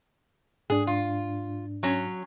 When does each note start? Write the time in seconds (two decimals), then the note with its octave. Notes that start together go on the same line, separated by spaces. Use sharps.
0.70 G#2 D4 G#4
0.87 F4
1.83 F#3 C#4